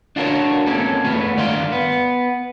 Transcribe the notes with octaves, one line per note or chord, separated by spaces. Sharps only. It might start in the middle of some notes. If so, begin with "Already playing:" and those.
D4 F4 F#4 A4 A#4 C#5
A#3 C4 C#4 A4
A3 B3 F4
G2 D#3 D5 F5 C6
B3